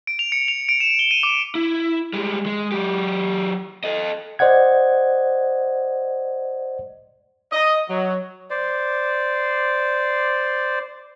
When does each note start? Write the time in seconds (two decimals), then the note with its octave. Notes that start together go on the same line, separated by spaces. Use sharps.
0.07 D7
0.19 F7
0.32 C#7
0.48 F7
0.69 D7
0.80 E7
0.99 G7
1.11 D#7
1.23 D6
1.55 E4
2.13 G3 G#3
2.46 G#3
2.72 F#3 G4
3.84 A4 D#5
4.39 C5 D5 D#5 F#5 G#6
7.52 D#5
7.89 F#3
8.50 C5 D5